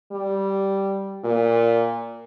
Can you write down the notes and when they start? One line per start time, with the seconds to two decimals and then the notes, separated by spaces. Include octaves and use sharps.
0.12 G3
1.24 A#2